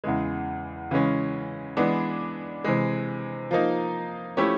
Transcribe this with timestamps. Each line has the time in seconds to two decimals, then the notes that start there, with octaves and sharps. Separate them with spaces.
0.04 E2 C#3 E3 G#3
0.91 C#3 E3 G#3 C#4
1.77 E3 G#3 B3 D4
2.64 C3 E3 G#3
3.51 F3 A#3 D#4
4.37 F3 A3 C#4 E4 G4